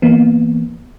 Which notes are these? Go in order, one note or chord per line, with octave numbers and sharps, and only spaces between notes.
E3 A#3 B3